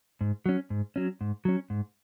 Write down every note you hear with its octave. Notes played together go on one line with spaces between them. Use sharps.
G#2
F#3 C#4
G#2
F#3 C#4
G#2
F#3 C#4
G#2